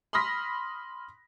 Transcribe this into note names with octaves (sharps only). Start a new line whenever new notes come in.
B5 C6 D#6 F6 A#6 B6